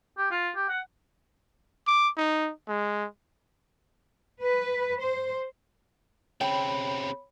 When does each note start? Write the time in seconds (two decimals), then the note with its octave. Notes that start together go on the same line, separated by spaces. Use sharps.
0.18 G4
0.31 F4
0.55 G4
0.69 F#5
1.87 D6
2.17 D#4
2.68 G#3
4.41 B4
4.99 C5
6.41 C#3 C4 C#5 G5 B5